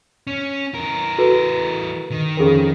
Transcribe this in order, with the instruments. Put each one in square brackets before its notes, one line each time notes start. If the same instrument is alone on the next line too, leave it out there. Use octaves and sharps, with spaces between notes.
[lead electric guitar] C#4
E3 A#4
[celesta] F#4 A4 B4
[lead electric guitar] D#3
[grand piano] F2 C#3 [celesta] G#4 A#4